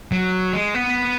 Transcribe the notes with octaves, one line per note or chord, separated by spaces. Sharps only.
F#3
G#3
B3